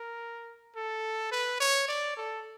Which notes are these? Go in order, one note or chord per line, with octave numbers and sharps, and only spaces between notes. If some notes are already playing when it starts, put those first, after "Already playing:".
Already playing: A#4
A4
B4
C#5
D5
A4